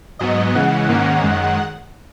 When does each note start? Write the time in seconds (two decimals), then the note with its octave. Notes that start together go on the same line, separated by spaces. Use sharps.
0.19 G#2 F#3 B3 D#5
0.54 C#3 E3 G#3 F#5
0.89 G#2 D#3 A#3 C#4
1.24 F#2 D#3 G#3